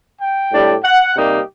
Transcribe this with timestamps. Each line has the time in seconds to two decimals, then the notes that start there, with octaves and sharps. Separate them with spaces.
0.19 G5
0.51 A2 G3 D4
0.83 F#5
1.16 C3 G3 A#3 D#4 G4